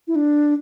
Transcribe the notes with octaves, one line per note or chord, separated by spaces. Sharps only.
E4
D4